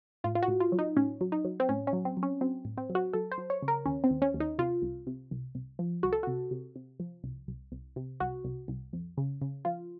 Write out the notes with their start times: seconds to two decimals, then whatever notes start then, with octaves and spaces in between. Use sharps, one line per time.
0.24 A2 F4
0.35 F4
0.43 F#4
0.48 A2
0.60 F4
0.72 F#3
0.79 D#4
0.97 A2 C#4
1.21 F#3
1.32 D#4
1.45 F#3
1.60 C4
1.69 A2 C#4
1.87 C#4
1.93 F#3
2.05 C4
2.17 F#3
2.23 C#4
2.41 F#3 C4
2.65 A2
2.78 C4
2.90 F#3
2.95 F#4
3.13 F#3 A4
3.32 C5
3.38 F#3
3.50 C#5
3.62 C#3
3.68 A#4
3.86 D#2 C#4
4.04 C4
4.10 D#2
4.22 C#4
4.34 D#2
4.40 D#4
4.58 C3 F4
4.82 C2
5.07 C3
5.31 C2
5.55 C2
5.79 F3
6.03 C2 F#4
6.12 A4
6.23 C3 F#4
6.51 C3
6.76 C3
7.00 F3
7.24 C2
7.48 C2
7.72 C2
7.96 C3
8.20 C2 F#4
8.45 C2
8.68 C2
8.93 F2
9.17 C#3
9.42 C#3
9.65 F3 F4